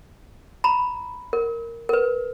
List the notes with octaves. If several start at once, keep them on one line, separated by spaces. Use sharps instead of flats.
A#5 B5
A#4
A#4 B4